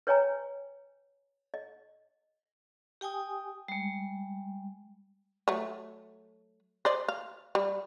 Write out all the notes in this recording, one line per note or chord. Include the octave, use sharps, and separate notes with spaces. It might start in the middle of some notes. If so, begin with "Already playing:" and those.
B4 C#5 D#5 G5 G#5 A#5
D#5
G4 G5 G#5 D#6
G3 G#3
F#3 A3
C5 D5 D#5
F5
G3